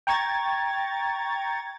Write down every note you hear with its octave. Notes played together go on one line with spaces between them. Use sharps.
G5 A#5 C#6 G#6 A6